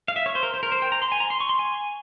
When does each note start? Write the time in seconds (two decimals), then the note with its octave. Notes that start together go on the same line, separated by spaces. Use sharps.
0.08 F5
0.16 E5
0.26 C#5
0.35 C5
0.43 A#4
0.54 C5
0.63 A#4
0.72 C5
0.82 G5
0.92 A#5
1.02 C6
1.12 G#5
1.20 A#5
1.30 C6
1.40 C#6
1.49 C6
1.59 G#5